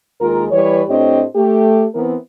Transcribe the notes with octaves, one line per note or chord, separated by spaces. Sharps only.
D#2 G#3 F4 A#4
E3 G3 B4 C#5
A2 C4 D4 G4 C#5 D#5
A3 G4
E3 B3 C4 A#4